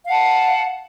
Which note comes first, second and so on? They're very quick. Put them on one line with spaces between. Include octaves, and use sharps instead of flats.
F5 F#5 A5